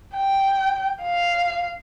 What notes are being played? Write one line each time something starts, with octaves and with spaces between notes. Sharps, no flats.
G5
F5